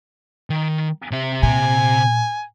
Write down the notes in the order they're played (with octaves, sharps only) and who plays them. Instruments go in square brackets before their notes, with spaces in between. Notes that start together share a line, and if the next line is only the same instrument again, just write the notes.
[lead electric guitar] D#3
C3 E5
[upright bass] A#2 [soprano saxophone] G#5